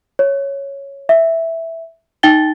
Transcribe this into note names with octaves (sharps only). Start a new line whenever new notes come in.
C#5
E5
D#4 G5 A6 G7